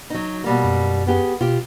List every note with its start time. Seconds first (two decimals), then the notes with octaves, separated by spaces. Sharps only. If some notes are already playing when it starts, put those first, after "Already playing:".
0.10 F#3 D#4
0.44 B2 G3 A#3
0.64 F#2
1.07 B3 G4 G#4
1.41 B2 F4 G4